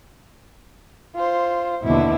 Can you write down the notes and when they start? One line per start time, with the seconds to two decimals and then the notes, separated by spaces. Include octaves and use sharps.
1.15 F4 C5
1.84 D#2 B2 D3 E4